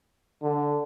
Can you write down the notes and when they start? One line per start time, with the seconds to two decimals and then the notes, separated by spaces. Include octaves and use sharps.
0.43 D3